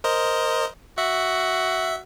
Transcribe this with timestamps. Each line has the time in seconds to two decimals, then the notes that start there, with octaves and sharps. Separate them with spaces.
0.04 A#4 C5 D#5
0.98 F#4 E5